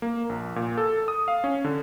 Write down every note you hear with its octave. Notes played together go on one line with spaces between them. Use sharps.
A#3
A#1
A#2
A4
D#6
F5
C#4
D3